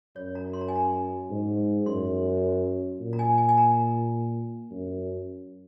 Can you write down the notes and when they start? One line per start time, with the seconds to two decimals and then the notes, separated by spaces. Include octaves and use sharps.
0.16 F#2 C#5
0.35 A#5
0.53 C6
0.61 A#5
0.68 G#5
0.76 A#5
1.30 G#2
1.86 F#2 C6
3.00 A#2
3.13 A#5
3.19 G#5
3.38 G#5
3.49 G#5
3.57 A#5
4.71 F#2